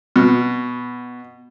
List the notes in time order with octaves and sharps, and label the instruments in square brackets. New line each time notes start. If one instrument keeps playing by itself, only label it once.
[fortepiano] B2